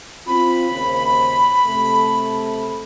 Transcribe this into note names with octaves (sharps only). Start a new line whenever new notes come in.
C4 F4 B5
D#2 C#3 C5
C3 A3